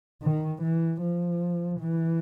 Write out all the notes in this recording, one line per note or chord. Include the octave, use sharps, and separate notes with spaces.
D#3
E3
F3
E3